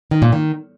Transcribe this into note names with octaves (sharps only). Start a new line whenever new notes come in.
D#3
A#2
D#3